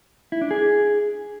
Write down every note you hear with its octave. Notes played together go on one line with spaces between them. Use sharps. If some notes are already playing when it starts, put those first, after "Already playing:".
E4
D4
G#4